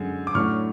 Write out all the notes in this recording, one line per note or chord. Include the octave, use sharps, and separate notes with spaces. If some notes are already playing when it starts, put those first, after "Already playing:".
Already playing: F#2 D3 G#3
D6
A2 F#3 A3 D4 C#6 F6